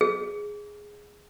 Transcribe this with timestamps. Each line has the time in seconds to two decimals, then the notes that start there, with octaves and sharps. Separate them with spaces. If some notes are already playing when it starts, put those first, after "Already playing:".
0.01 G#4